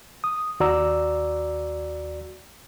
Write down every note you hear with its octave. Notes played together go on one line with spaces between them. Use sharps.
D#6
D#2 F#4 D5 A#5 E6